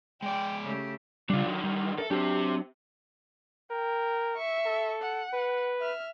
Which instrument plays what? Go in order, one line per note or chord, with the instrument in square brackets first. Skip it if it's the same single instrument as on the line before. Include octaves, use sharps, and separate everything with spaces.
[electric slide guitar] G#3 D5 [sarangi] G5
[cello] C#3 G4 [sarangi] A3
[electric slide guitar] C#3 G3 [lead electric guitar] D4 F4
[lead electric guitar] D3 D#3 [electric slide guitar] F#3
[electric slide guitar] G3
[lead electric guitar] A4 [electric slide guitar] A#4 D5 E5
[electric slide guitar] F#3 D4 A5 [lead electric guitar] C4 G4
[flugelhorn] A#4 [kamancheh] G5
[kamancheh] E5 C#6
[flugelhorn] A4
[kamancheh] F#5
[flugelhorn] B4
[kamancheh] E5 F6